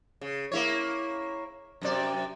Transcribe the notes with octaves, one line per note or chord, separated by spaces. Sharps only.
C#3
A#3 E4 C#5
F#2 C3 D5